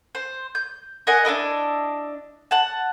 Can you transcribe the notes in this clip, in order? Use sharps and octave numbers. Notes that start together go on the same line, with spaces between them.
C5
G6
A#4 D#5 F#5 G#5
D4 E4 A#4 D#5
F#5 A5